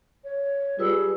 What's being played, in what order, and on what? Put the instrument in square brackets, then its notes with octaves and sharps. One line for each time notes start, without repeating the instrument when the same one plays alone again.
[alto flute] C#5
[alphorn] G3 [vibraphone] F4 B4 E6 [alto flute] G#4